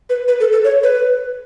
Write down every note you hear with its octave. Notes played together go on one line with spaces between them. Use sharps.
B4
B4
A4
A4
C#5
B4